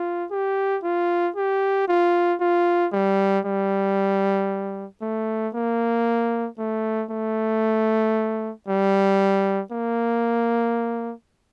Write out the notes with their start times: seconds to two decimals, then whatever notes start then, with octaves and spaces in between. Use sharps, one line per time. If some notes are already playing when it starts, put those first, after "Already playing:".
Already playing: F4
0.31 G4
0.83 F4
1.36 G4
1.88 F4
2.41 F4
2.93 G3
3.45 G3
5.02 A3
5.55 A#3
6.59 A3
7.11 A3
8.68 G3
9.72 A#3